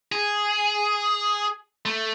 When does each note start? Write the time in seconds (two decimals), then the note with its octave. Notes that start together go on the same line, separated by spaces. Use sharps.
0.12 G#4
1.86 A3